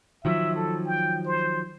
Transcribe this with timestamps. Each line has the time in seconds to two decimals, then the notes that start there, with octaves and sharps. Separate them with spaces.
0.25 D#3 F3 F#3 E5
0.56 A4
0.86 G5
1.26 C5